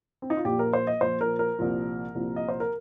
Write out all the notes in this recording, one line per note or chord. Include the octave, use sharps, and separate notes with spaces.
C4
D#4
F4
A#1 A#2 F3 G4
A#4
C5
D#5
A#1 A#2 F3 C5
A#4
A#4
C2 A#2 F3
C2 A#2 F3
D#5
C5
A#4